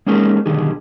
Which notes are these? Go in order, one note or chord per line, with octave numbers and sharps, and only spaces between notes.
G#3 A#3 C#4 D#4 G#4 A#4
B1 D3 D#3 G3 G#4